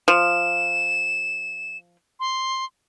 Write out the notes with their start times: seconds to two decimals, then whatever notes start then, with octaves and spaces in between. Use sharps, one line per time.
0.08 F3 E7
2.20 C6